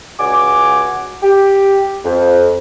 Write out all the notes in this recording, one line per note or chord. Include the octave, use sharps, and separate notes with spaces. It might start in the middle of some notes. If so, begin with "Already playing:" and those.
C#2 F#4 G#5 D6
G4
F2